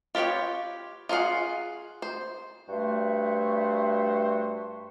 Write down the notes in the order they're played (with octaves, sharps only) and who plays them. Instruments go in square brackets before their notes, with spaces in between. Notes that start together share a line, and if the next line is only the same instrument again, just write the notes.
[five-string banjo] F4 G4 B4 C#5 G5
F4 G#4 C#5 F5 F#5
C5
[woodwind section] G2 A3 F#4 C5 E5